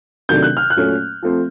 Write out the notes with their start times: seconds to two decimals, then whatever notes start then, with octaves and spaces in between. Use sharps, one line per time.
0.29 C3 D#3 F#3 A3 D4 G6
0.43 F#6
0.57 F6
0.70 F#6
0.76 A#2 F#3 A3 C#4
1.23 F3 A3 C4